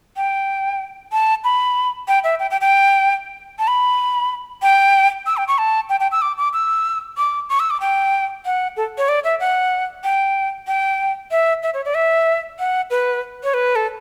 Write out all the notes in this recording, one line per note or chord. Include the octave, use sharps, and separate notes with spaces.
G5
A5
B5
G5
E5
G5
G5
G5
A5
B5
G5
E6
G5
C#6
A5
G5
G5
E6
D6
D6
E6
D6
C#6
E6
D6
G5
F#5
A4
C#5
D5
E5
F#5
G5
G5
E5
E5
C#5
D5
E5
F#5
B4
C#5
B4
A4